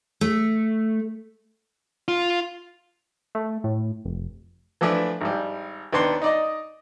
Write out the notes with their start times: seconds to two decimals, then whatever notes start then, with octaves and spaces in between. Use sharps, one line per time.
0.21 A3
2.08 F4
3.35 A3
3.64 A2
4.05 F1
4.81 E3 F3 A3 D4 E4
5.21 G#1 G3
5.93 D#2 B3 D4 C6
6.22 D#4 D5 D#5